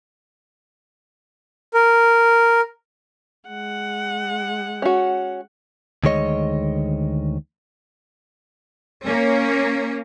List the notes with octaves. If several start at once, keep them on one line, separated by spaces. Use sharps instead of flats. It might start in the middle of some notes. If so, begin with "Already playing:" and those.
A#4
G#3 F#5
C#4 F#4
D2 D#3 G#3 C#5 D#5
A#3 C#4